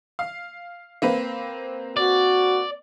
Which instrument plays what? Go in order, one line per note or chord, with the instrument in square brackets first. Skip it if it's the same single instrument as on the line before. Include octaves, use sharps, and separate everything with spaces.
[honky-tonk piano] F5
A#3 C4 B4
[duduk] F#4 [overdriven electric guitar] D5